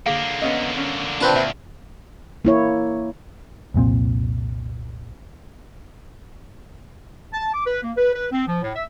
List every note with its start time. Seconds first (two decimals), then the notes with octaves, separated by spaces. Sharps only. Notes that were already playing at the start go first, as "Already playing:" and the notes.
0.06 D3 A#3 G#4 F5
0.42 B3 C#4 D#5
0.77 C#4
1.21 C4 D4 F4 B4 A5
1.36 D2 A#2 E5
2.45 A#3 E4 C#5
3.74 C2 F2 A#2 C4
7.34 A5
7.54 D6
7.67 B4
7.83 A#3
7.97 B4
8.14 B4
8.32 C4
8.47 F3
8.62 A2
8.76 E5